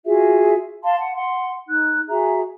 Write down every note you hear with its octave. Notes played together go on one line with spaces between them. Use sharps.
F4 F#4 G#4 E5
F5 A5 C6
F#5
F#5 C6
D#4 F#6
F#4 G#4 E5 A#5